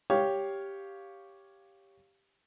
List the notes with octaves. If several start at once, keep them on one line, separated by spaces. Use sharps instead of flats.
G4 C#5 F5